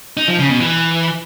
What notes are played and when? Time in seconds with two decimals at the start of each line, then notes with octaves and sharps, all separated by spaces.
0.17 D#4
0.28 F3
0.39 C#3
0.50 B2
0.60 E3